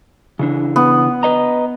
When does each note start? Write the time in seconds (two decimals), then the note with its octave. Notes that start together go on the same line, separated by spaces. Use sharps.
0.39 C#3 E3 D4
0.76 B3
1.23 B4 D#5 A#5